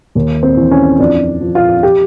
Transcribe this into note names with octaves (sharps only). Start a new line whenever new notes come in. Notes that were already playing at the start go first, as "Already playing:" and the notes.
D#2
C4
E3
C#4
F2 D4
F3
F4
G4